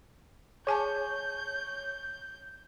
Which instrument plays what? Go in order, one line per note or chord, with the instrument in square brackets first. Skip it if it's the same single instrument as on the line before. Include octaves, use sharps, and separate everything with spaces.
[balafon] G#4 G#5 A5 [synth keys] C#5 [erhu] G6